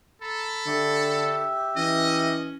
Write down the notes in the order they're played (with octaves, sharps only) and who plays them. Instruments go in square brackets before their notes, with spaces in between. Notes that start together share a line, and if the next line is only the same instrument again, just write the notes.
[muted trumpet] A4 [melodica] A#5 [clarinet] B5
[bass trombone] D3 [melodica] G4 E5
[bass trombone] E3 [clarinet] C#4 [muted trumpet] D#5